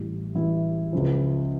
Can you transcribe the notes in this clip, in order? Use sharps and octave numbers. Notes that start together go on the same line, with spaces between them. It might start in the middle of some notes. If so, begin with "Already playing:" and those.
Already playing: A1 A2 E3 G3
A1 A2 E3 G3 E4
C#2 C#3 F3